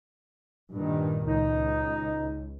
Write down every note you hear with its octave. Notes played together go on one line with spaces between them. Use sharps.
G2 A#2 D#3
C#2 D#4